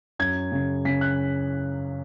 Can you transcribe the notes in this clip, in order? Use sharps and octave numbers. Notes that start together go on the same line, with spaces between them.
F#2 G#6
C#3
C#3 B6
F#6